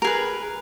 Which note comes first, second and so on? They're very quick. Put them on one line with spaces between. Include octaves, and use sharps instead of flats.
A#4 G#4 B4